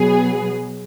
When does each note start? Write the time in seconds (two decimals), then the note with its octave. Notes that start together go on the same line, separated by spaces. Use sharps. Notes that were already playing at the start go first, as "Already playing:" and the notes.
Already playing: B2 F#3 B3 G#4